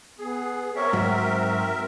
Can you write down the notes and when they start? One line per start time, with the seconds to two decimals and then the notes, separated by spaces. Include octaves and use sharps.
0.19 B3 G#4
0.75 C4 A#4 C#5 E5
0.93 G#2 F#3 F#4